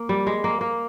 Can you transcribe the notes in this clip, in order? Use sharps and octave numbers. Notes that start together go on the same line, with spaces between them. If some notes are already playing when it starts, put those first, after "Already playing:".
Already playing: A#3
G3
G#3
A#3
A#3